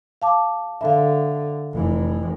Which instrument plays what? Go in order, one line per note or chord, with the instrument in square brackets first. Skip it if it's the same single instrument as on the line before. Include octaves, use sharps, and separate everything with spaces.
[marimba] F5 A5 D6
[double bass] D3 [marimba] E5 F5
[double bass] F1 E3